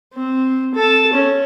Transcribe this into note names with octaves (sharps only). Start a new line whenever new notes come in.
C4
A4 A5
C#4